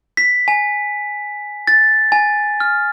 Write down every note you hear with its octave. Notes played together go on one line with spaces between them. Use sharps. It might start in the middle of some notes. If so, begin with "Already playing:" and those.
B6
G#5
A6
G#5
F6